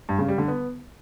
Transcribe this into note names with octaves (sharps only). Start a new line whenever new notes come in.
G2
C#3
G3
D3
B3